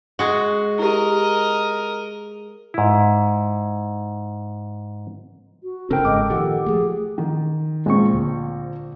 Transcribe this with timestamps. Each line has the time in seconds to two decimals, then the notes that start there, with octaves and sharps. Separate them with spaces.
0.19 G#3 F#4
0.79 E4 G4 A#4 D#5
2.74 G#2 E4
5.63 F#4
5.90 G1 C#3 C4 C#4 A4 A#4 G5
6.05 G1 G#2 G#3 D#5 D6
6.30 A#2 D#3 F3 G4 A4 F#5
6.66 F3 A3 G#4
7.18 D#3
7.86 A#1 G#3 C4 C#6
8.13 D2